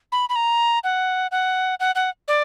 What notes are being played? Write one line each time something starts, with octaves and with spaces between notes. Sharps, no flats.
B5
B5
A#5
F#5
F#5
F#5
F#5
D5